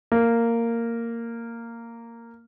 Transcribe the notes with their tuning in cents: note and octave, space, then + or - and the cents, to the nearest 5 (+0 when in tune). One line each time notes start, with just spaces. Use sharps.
A#3 -10